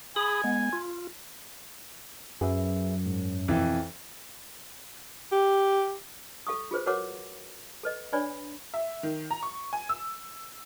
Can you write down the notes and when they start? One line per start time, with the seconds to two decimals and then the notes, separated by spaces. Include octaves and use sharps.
0.16 G#4 G#5 B5 D#6
0.44 G#3 B3
0.73 F4
2.41 F#2 G#4 B4 E5
3.06 G#2
3.48 F2 B2 E3 F3
5.32 G4
6.47 A4 F5 C#6 D#6
6.71 F4 G#4 B4 C5
6.86 F#4 A#4 B4 C#5 F#5 D6
7.83 A4 B4 D#5
8.13 D4 B4 C#5 D5 G#5 B5
8.74 E5
9.03 D#3
9.31 A#5
9.43 C#6
9.73 G#5
9.89 E6